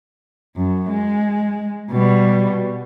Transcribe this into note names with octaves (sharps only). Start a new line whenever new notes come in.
F#2
G#3
B2 G3